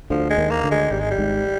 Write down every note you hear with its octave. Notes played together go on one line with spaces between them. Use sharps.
D2 D3 F3
G#3
D#2 D#3
A#3
D2 D3
G#3
G#1 G#2 G3
G#3
G3
G#1 G#2